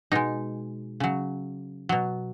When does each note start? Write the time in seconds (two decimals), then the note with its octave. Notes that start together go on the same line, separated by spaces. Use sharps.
0.12 B2 G#3 D#4
1.00 C#3 F#3
1.89 B2 F#3